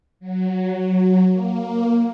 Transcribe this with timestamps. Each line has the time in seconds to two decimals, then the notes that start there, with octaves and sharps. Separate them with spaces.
0.20 F#3
1.32 A#3